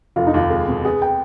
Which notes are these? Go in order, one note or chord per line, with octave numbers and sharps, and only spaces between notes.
F1 F4
D#4
D#2 F4
G#3
B2
B3 G#4
G5